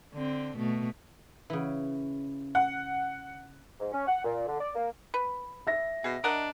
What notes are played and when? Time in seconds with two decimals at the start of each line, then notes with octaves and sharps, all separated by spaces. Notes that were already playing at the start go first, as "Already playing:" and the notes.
0.13 D3 C4
0.58 B2 A3
1.50 C#3 E3
2.55 F#5
3.80 G#2
3.92 C#4
4.07 F#5
4.24 A#2
4.47 D3
4.60 D5
4.75 A#3
5.14 B4
5.67 E5 A#6
6.04 B2 G#4
6.24 D4 A#4 D#5 F#5